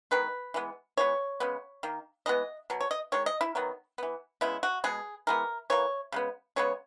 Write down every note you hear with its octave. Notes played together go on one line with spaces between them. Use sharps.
D#3 G#3 B3 B4
E3 G#3 B3
E3 G#3 B3 C#5
C#3 G#3 B3
D#3 A#3
E3 G#3 B3 D#5
B2 F#3
C#5
D#5
D#3 G#3 C#5
D#5
E4
D#3 F#3 B3
E3 B3
C#3 G#3 B3 E4
F#4
B2 G#3 B3 G#4
E3 G#3 B3 A#4
E3 A#3 C#5
C#3 G#3 B3
C#3 G#3 B3 C#5